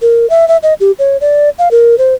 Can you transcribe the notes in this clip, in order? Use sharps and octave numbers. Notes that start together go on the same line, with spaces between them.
A#4
E5
E5
D#5
G4
C#5
D5
F5
A#4
C5